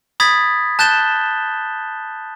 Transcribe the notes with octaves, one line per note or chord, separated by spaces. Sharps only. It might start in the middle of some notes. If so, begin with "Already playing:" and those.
B5 D#6 G#6 A6 B6
A5 F#6 G6 A6 E7 G7